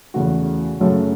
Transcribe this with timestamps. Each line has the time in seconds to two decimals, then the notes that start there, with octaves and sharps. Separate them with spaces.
0.14 E2 C#3 A3 F#4
0.80 F#2 C#3 F#3 A3